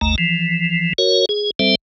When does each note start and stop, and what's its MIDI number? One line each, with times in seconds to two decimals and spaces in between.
0.01 0.15 32
0.01 0.15 39
0.01 0.15 57
0.01 0.15 82
0.18 0.93 52
0.18 0.93 53
0.98 1.26 66
0.98 1.26 70
0.98 1.26 73
1.29 1.51 68
1.59 1.75 55
1.59 1.75 60
1.59 1.75 69
1.59 1.75 72
1.59 1.75 76